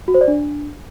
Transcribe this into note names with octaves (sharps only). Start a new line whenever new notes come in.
F#4
C5
D5
D4